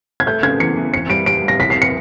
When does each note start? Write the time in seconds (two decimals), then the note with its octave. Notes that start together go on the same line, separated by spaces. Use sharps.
0.20 G#6
0.26 A3 G6
0.43 C#3 G#6
0.60 E2 C#7
0.77 E3
0.93 C4 C#7
1.10 G3 D7
1.26 G3 D7
1.43 G3
1.48 A#6
1.60 C2 B6
1.70 C7
1.82 C#7